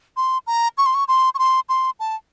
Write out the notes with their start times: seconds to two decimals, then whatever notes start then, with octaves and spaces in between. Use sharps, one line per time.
0.17 C6
0.47 A#5
0.78 C#6
0.86 C6
0.95 C#6
1.08 C6
1.35 C#6
1.39 C6
1.69 C6
2.00 A5